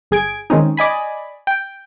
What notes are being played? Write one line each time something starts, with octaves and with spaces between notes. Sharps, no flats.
G1 G#4 G#6 D7
D#3 G#3 C4 C#4 D#4
D5 D#5 G#5 B5
G5